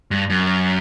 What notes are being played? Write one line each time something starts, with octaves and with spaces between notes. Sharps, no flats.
G2
F#2